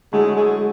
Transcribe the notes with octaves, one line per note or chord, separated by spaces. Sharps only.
D3 F#3 G#3 A3 E4
G#3